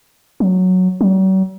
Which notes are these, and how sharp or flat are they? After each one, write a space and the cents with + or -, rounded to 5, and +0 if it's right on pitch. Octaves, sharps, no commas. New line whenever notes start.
F#3 -5
F#3 +45